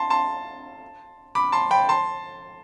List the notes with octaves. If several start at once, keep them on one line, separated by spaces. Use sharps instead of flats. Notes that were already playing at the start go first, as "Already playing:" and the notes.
Already playing: A5 C6
A5 C6
B5 D6
A5 C6
G5 B5
A5 C6